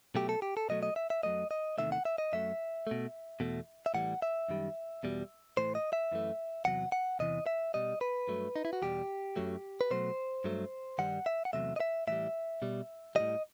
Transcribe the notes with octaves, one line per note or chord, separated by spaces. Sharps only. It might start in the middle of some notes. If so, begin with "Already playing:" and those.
B2 F#3 A3 G4
A4
G4
A4
B2 F#3 A3 D#5
D#5
E5
E5
F#2 F#3 A3 D#5
D#5
E2 C3 D#3 A3 E5
F#5
E5
D#5
F#2 F#3 A3 E5
B2 A3
E2 B2 A3
E5
A2 E3 G3 F#5
E5
F#2 D#3 G3
E2 B2 G3
A2 E3 A3 C5
D#5
E5
F#2 E3 A3
E2 C3 F#3 F#5
F#5
E2 C3 E3 D#5
E5
B2 G3 D#5
B4
G2 F#3 A3
D#4
E4
F#4
E2 B2 G3 G4
F#2 F#3 A3
B4
B2 F#3 A3 C5
G2 F#3 A3
G2 D#3 G3 F#5
E5
F#5
E2 C3 F#3 A3 E5
D#5
E5
A2 E3 G3 E5
B2 G3
E3 G3 D#5
A2